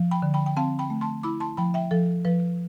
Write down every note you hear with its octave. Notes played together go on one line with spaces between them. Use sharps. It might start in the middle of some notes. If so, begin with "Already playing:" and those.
Already playing: F3
G5 B5
D3
G5 B5
G5
C4 F5 A5
G5 B5
A3
A5 C6
E4 B5 D6
A5 C6
F3 G5 B5
E5 G5
F3 A4
F3 B4